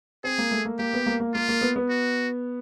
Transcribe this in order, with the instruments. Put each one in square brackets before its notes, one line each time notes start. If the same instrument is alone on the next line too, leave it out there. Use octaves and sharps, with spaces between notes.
[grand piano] C4 [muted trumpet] G#4
[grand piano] A#3
A3
A#3
[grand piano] A#3 [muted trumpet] G4
[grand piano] B3
A#3
A#3
[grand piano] A#3 [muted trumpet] F4
[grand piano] A#3
B3
B3
[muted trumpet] F#4